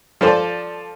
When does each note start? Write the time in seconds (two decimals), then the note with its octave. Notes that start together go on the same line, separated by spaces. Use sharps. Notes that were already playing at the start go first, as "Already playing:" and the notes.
0.21 F3 A4 C5 D5